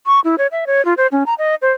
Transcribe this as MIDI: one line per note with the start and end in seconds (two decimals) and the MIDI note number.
0.06 0.20 85
0.24 0.36 64
0.38 0.47 73
0.52 0.65 76
0.67 0.84 73
0.85 0.94 65
0.97 1.07 72
1.12 1.23 61
1.26 1.34 82
1.38 1.55 75
1.62 1.71 72